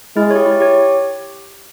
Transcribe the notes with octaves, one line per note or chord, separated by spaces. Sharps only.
G#3 E4
C#5
G4
E4
G4 C#5